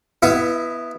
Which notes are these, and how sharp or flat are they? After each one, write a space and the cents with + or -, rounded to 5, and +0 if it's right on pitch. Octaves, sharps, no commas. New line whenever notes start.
B3 +0 E4 +10 D#5 +40